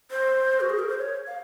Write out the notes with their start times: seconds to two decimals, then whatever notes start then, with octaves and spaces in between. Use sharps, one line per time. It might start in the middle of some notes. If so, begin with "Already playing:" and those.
0.11 C5
0.61 F#4
0.70 G#4
0.79 A#4
0.89 C5
0.98 C#5
1.27 F5